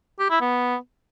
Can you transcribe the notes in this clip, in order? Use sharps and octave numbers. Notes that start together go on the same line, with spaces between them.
G4
E4
B3